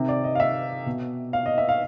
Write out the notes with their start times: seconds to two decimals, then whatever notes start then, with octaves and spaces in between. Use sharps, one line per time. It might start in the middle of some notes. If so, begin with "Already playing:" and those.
Already playing: C3 D#3
0.09 D5
0.24 D#5
0.35 F5
0.40 E5
0.86 B2
1.33 F5
1.46 D#5
1.58 E5
1.69 F5